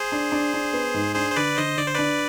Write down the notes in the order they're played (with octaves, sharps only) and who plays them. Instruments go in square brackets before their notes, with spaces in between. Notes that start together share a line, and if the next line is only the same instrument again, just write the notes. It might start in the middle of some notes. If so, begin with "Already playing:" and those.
Already playing: [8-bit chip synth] G#4 C5
[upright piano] D4
D4
D4
B3
G#2
[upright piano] D4 [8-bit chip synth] G#4 C5
[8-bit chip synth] C5
[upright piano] D3 [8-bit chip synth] B4 D5
[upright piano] D3 [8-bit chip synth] C5 D#5
[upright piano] D3 [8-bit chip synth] D5
[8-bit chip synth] C5
[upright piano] D4 [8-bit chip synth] B4 D5